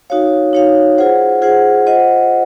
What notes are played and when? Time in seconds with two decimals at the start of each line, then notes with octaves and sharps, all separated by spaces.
0.10 D#4 F#4 C#5 F5
0.53 D#4 F#4 C#5 F5
0.98 F4 G#4 C5 F#5
1.42 F4 G#4 C5 F#5
1.87 F4 C5 D#5 F#5